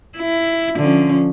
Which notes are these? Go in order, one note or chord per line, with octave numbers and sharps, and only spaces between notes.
E4
D3 F3 C#4